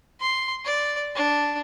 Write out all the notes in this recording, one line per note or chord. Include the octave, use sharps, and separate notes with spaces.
C6
D5
D4